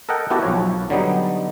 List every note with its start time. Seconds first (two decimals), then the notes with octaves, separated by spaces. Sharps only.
0.09 A4 A#4 D#5 F#5 G5
0.30 B3 E4 F#4 G4 A4
0.43 B1 F3 C#5
0.90 D3 F#3 G3 B3 D#4